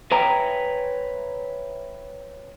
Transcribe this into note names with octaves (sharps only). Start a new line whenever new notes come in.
B4 C#5 E5 G5 G#5 A#5